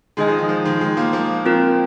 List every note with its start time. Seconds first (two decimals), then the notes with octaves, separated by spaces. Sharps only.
0.17 D#3 G#3 D#4 G#4 D#5 G#5
0.28 F3
0.39 D#3
0.49 F3
0.65 D#3 G#3
0.81 D#3 G#3
0.97 F3 A#3
1.13 F3 A#3
1.45 C4 F4 A#4